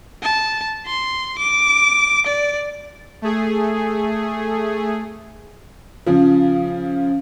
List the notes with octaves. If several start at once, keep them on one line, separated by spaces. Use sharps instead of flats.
A5
C6
D6
D5
A3 G#4
C#3 F3